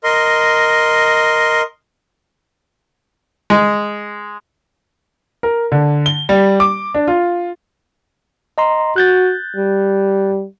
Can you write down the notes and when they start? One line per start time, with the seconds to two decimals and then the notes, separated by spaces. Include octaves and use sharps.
0.04 A#4 D#5 C6
3.50 G#3
5.43 A#4
5.72 D3
6.06 G7
6.29 G3
6.60 D6
6.95 D4
7.08 F4
8.58 D#5 A#5 C6
8.96 F#4 F#6 G6 A6
9.56 G3